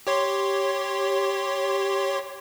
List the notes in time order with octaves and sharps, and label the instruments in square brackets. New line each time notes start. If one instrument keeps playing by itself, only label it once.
[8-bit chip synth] G4 C#5 C6